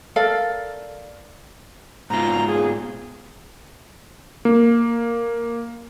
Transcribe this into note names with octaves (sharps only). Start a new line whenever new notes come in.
A4 A#4 D5 F5
G#2 B2 F4 A#5
G#4
A#3